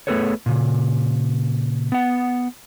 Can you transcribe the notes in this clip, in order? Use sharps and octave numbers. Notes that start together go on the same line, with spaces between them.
A3 B3 G#4 A4 B4 C#5
A#2 C#3
B3 F#5